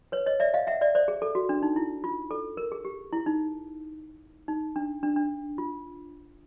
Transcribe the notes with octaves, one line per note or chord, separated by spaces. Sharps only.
B4 C#5
C#5 D#5
D5 E5
D#5 F5
E5 F#5
D5 E5
C5 D5
G#4
A4
F#4
D4
D#4
E4
F4
A4
A#4
G#4
G4
E4
D#4
D#4
D4
D4
D4
F4